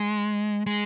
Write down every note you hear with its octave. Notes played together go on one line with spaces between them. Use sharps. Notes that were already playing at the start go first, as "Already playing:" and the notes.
Already playing: G#3
G#3